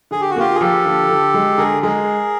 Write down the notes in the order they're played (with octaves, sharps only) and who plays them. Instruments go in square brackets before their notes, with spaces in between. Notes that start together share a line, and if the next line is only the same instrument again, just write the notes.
[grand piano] D3 [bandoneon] G#4
[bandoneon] G4
F#4
[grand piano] A#3 [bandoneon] F4 G4
[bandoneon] G#4
[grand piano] F3 [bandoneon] G4 A4
[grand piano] D3
D3
G#3
[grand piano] D3 [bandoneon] G#4 A#4
[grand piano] G#3 [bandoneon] G#4 A#4